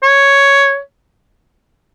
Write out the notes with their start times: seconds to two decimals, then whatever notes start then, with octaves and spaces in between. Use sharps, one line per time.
0.03 C#5